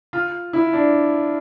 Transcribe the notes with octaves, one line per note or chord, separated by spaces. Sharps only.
F4
E4
D4